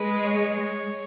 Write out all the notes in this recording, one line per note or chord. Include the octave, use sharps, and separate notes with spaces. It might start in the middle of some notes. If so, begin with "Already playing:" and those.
Already playing: G#3 B4
C#5